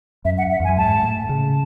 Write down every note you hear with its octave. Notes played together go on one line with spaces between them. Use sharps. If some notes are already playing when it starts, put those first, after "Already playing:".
F#2 E5
F#5
E5
E2
G#5
F#2
G#2 A5
A2
C#3